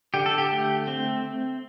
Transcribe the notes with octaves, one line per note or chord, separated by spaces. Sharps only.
D3 G4
A4
G4
A3
C4